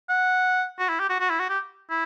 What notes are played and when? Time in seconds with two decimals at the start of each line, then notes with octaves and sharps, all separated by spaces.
0.09 F#5
0.79 F#4
0.89 E4
1.00 G4
1.10 F#4
1.20 F#4
1.30 E4
1.40 F#4
1.49 G4
1.90 E4